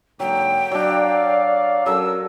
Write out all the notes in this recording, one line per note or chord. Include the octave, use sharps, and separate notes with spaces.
G#2 D3 F#3 A#3 G5
F#3 D4 D5 F5
F#3 C#4 A4 A#4 E6